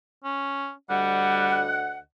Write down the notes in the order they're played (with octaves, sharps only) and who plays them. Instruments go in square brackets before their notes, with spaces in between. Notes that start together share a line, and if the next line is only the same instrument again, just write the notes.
[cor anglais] C#4
[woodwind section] D2 D#5 F#5 [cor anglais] G3